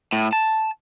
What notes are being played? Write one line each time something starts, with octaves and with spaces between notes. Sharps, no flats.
A2
A5